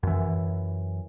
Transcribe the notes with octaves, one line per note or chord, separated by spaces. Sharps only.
F#2 E3